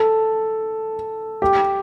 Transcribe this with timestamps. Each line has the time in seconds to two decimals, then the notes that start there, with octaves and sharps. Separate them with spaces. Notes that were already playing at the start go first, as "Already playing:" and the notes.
Already playing: A4
1.42 G4